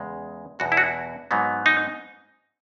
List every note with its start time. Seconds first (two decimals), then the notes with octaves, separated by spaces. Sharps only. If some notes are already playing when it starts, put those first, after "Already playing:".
Already playing: E2 C#3 G#3
0.59 E2 B2 F#3 F#4
0.72 E4
0.77 F#4
1.31 G#2 F#3 B3 D#4
1.66 D#4